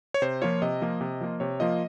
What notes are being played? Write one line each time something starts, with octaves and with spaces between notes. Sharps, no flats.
C#5
C3 C5
F3 A#3 F4 C#5
C3 D#5
F3 A#3 F4
C3
F3 A#3 F4
C3 C#5
F3 A#3 F4 D#5